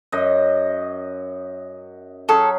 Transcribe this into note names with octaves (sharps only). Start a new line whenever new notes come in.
F#2 D#5
F#3 C#4 G#4 A4